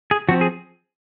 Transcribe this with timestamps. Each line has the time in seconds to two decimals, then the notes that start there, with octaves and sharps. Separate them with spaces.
0.11 G#4
0.29 F3 C4 F#4
0.41 G#4